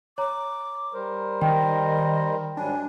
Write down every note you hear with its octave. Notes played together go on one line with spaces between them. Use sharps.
C#5 A#5 D6
G3 A#4 C5
D#3 D#5 G5
G#2 F#3 G3 D4 G#5